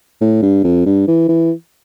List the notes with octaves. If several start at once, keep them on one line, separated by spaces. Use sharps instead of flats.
A2
G2
F2
G2
E3
E3